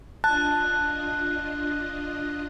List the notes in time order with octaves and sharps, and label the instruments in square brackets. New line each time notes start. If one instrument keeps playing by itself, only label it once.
[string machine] D4 F4 D#5 [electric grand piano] A5 [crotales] F#6